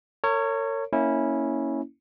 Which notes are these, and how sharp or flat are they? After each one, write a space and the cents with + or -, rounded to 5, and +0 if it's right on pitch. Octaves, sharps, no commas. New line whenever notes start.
A#4 -40 C#5 +0
A#3 -10 C#4 +0 E4 -20